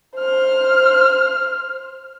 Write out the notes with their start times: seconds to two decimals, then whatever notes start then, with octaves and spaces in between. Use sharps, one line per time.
0.18 C5 F6